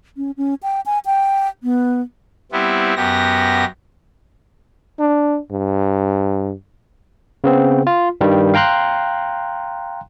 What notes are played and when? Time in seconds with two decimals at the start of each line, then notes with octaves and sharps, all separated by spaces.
0.17 C#4
0.37 C#4
0.63 G5
0.86 G#5
1.06 G5
1.63 B3
2.52 G3 B3 C4 E4
2.96 F#2 B3 G4 A#6
4.99 D4
5.51 G2
7.44 C#3 B3 C4
7.87 F4
8.21 G2 D#3 G3
8.54 F5 G5 A#5 C6 F#6